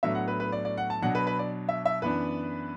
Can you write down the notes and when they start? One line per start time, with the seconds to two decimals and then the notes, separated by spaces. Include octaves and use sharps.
0.03 A2 F#3 B3 D4 E5
0.15 F#5
0.28 B4
0.40 B4
0.52 D5
0.65 D5
0.77 F#5
0.90 A5
1.02 B2 F#3 D4 F#5
1.15 B4
1.27 B4
1.39 D5
1.69 E5
1.86 E5
2.02 F#2 E3 B3 D4 B4